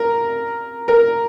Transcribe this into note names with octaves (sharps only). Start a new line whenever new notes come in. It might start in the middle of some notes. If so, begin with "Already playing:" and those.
Already playing: A#4
A#4